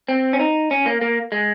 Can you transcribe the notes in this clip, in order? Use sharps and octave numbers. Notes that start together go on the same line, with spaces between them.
C4
C#4
D#4
C#4
A#3
A#3
G#3